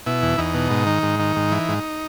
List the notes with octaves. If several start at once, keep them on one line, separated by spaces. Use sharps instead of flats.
B2 E4
E2
E2 D#4
B2
G#2
D#3
G#2
D#3
G#2
E3
G#2